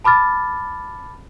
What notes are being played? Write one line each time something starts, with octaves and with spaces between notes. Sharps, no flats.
A5 B5 D6 F6 A6